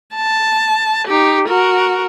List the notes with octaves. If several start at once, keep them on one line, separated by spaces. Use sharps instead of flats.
A5
D#4 G4
F#4 A#4